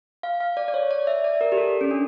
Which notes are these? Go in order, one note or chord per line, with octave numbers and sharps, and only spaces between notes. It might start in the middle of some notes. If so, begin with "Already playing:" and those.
F5
F5
D5
D5
C#5
D5
E5
D5
A#4
G4
A4
C#4
D4